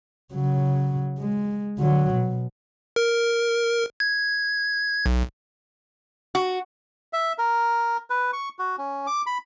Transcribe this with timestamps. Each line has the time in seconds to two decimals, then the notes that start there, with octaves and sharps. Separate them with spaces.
0.34 C#3 F#3
1.19 G#3
1.79 D3 F#3
2.14 B2
2.96 A#4
4.00 G#6
5.06 B1
6.35 F#4
7.13 E5
7.38 A#4
8.10 B4
8.33 C#6
8.59 F#4
8.78 C#4
9.07 D6
9.26 B5